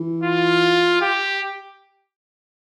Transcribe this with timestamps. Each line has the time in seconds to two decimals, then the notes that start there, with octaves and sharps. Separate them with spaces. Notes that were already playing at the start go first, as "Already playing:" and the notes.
Already playing: E3
0.24 F4
1.01 G4